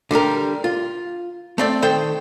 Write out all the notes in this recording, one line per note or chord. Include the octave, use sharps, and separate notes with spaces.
D3 G3 G4 A#4
F4
A3 C4 D5
D#3 A4 C5 G5